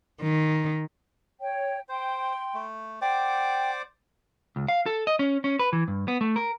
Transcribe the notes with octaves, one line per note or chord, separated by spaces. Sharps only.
D#3
C#5 G5
C5 G5 C6
A3
C5 D5 F#5 G5 D6
C#2
F5
A4
D#5
C#4
C#4
B4
E3
G2
B3
A3
A#4